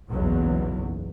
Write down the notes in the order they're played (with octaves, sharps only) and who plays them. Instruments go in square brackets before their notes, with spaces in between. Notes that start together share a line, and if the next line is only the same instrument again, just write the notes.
[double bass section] F#1 B1 E2 B2 F#3